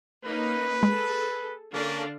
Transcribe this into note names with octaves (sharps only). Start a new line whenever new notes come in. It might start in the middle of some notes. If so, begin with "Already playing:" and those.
A#3 C#4 D#4 B4
G#3 G#4 A4
D3 A#3 C#4 D4 F5